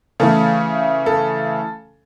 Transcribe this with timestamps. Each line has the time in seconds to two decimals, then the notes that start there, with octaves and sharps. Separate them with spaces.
0.20 C#3 E3 A3 A4
1.06 A4